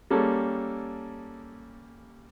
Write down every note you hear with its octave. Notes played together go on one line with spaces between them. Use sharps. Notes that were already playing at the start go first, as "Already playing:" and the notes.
G3 A#3 C#4 G#4 A4